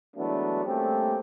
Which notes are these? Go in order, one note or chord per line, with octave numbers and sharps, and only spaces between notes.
E3 F#3 G#3 A3 B3 D4
G3 A3 A#3 C4 C#4 G4